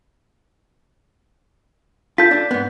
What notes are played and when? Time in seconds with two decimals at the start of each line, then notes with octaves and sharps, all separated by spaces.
2.18 F4 A4 G6 B6
2.31 D4
2.51 G#2 B3